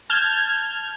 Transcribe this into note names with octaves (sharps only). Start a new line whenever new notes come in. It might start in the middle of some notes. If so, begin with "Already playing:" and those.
A5 F6 G6 G#6